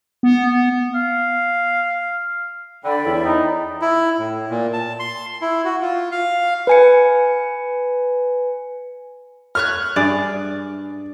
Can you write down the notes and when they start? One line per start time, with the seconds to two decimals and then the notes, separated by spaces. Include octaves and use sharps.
0.23 B3
0.95 F5
2.84 D3 D5 G5 B5
3.05 E2 C#4 E4
3.25 D#4
3.81 E4
4.19 A2
4.50 A#2
4.73 A5
4.99 C6
5.41 E4
5.65 F#4
5.81 F4
6.12 F5
6.67 B4 G#5 C#7
9.55 A3 C#5 F6 F#6
9.96 G2 G#4 D5